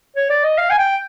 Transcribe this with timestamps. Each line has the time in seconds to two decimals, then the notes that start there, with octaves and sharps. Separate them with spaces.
0.16 C#5
0.30 D5
0.44 D#5
0.58 F5
0.70 G#5
0.78 G5